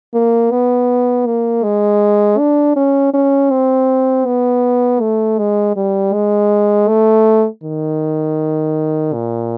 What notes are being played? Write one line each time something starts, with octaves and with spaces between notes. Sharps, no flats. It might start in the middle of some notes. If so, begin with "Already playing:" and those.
A#3
B3
A#3
G#3
D4
C#4
C#4
C4
B3
A3
G#3
G3
G#3
A3
D#3
A#2